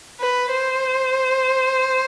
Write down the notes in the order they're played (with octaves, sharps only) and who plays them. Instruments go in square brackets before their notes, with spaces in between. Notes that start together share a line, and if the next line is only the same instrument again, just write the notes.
[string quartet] B4
C5